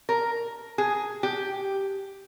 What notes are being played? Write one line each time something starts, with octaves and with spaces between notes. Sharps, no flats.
A#4
G#4
G4